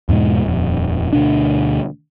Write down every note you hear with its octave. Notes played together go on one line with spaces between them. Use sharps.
E2 G#2 B2 G#3
D#1 F2
D2 B2 D4